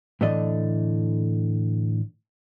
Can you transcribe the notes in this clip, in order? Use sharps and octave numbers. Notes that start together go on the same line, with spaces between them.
A2 D3 E3 A3 D4 D#5